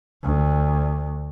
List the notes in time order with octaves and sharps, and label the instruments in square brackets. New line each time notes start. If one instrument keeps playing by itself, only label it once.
[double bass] D2